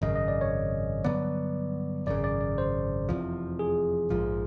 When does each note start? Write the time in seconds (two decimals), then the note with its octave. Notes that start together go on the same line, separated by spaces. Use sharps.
0.02 G#1 F#2 C#3 D#5
0.16 D#5
0.28 D5
0.41 C#5
1.05 G2 D3 F#3 B3 D5
2.06 G#1 F#2 C#3 D5
2.24 D5
2.41 D5
2.58 C5
3.09 F1 E2 C3 F3
3.59 G#4
4.10 A#1 G#2 F3